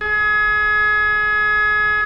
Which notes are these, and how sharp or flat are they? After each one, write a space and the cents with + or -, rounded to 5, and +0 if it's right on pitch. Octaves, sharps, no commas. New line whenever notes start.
G#4 +30